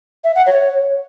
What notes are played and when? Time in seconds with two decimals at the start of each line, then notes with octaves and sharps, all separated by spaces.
0.24 E5
0.35 F#5
0.46 C#5